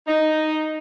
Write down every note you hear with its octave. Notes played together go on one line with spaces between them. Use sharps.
D#4